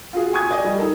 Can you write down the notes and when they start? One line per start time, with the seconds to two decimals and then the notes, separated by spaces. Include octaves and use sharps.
0.13 F4 F#4 G#4
0.33 G#5 C#6 D#6 G#6
0.51 D5 D#5 G#5
0.64 G3
0.79 D#4 A4 A#4